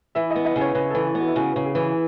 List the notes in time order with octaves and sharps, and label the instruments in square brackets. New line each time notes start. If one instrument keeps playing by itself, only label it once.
[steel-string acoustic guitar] E3 [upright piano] E5
[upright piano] D#5
[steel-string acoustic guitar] B3
[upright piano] D#5
[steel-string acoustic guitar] C#3 [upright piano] C#5
[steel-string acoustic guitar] C#3 [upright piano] B4
[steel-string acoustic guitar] E3 [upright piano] A4
[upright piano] A4
[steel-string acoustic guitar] B3
[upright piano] F#4
E4
[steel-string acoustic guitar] C#3 [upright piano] F#4
[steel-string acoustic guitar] C#3
[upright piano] G#4
[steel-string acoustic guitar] E3